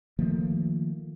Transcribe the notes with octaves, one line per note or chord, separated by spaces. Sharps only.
D#3 F3 A3 A#3